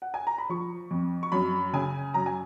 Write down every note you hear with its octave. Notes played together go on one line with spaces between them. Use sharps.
F#5
G#5
A#5
B5
F3 C#6
F2
C#6
F#2 B5
C#3 G#5
F#2 A#5
G#5